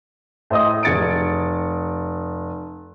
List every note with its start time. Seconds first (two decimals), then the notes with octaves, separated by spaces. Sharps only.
0.50 A2 C5 D#5 D#6
0.83 F1 G#6 A6 C#7 D7